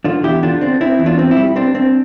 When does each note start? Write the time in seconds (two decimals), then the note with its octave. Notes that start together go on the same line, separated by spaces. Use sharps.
0.04 D3 D4 F4
0.23 E2 E4 G4
0.43 D3 D4 F4
0.61 C4 D4
0.81 C4 E4
0.99 E2
1.06 D4 F4
1.19 C4
1.31 E4
1.37 G3
1.56 C4 D4
1.75 C4